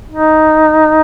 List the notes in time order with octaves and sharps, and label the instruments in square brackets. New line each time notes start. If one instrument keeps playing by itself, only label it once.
[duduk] D#4